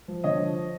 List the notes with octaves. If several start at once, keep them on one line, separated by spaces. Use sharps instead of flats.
F3
D3 C#5 D#5
F3